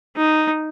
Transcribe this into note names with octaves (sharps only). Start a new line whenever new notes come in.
D#4